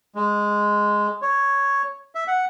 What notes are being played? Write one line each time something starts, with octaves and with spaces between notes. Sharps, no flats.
G#3
C#5
E5
F#5